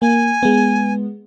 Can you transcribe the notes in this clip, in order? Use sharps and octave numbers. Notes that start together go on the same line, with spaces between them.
A#3 G#5
G#3 B3